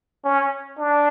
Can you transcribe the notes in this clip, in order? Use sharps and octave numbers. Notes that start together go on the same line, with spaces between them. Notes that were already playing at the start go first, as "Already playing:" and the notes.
C#4
D4